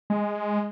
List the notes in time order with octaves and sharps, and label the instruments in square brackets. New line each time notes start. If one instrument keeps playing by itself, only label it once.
[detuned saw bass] G#3